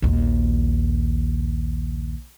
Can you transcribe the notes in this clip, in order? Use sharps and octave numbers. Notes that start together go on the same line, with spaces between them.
A#1 D#2